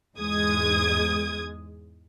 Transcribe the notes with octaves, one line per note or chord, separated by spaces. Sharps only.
E2 G#2 G#3 D#6 G#6